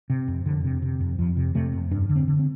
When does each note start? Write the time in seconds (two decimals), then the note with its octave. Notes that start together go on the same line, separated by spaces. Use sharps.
0.10 C3
0.28 F2
0.45 F2 D3
0.64 C3
0.82 C3
1.01 F2
1.19 F2 F3
1.36 C3
1.55 C3 A3
1.73 F2
1.91 G2 D4
2.09 D3
2.16 C4
2.28 D3
2.39 C4